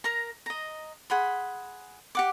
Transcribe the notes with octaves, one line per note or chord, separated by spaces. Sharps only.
A#4 A#5
D#5 A#5
G#4 F#5 B5 C6
G4 F#5 D6